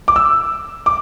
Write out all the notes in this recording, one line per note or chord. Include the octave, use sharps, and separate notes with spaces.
D6
E6
D6